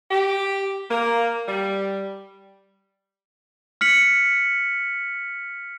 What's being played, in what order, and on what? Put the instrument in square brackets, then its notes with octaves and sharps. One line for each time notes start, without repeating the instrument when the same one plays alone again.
[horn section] G4
A#3
G3
[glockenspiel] F6 B6 C#7 F#7